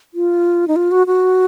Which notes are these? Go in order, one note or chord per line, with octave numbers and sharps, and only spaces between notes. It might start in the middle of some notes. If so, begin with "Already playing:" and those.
F4
D#4
F4
F#4
F#4